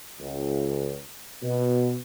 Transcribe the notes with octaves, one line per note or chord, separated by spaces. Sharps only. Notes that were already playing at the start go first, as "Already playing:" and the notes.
C#2
B2